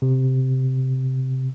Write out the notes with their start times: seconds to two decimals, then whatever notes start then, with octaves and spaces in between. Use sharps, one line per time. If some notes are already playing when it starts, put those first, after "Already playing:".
0.02 C3